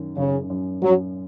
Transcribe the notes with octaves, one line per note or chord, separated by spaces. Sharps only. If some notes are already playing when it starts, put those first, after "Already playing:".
Already playing: F#2 D#3
F#2 C#3
F#2
F#2 F#3